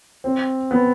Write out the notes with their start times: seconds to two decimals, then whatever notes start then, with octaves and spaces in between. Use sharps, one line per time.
0.24 C4
0.71 B3